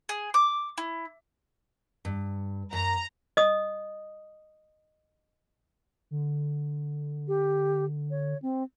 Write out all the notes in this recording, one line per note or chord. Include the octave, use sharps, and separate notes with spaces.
G#4
D6
E4
G2
F#2 A#5
D#5 D#6
D3
G4
C#5
C4